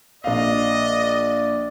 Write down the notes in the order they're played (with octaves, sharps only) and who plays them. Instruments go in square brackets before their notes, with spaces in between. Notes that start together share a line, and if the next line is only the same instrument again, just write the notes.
[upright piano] A#1 F5 [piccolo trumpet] D5 [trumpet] D#5